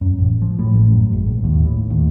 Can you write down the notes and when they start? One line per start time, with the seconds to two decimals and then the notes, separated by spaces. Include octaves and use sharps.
0.01 F#2
0.19 A1
0.42 F3
0.59 A2
0.74 A1
0.92 F#2
1.13 G#1
1.27 A#1
1.44 D#2
1.65 A2
1.90 D#2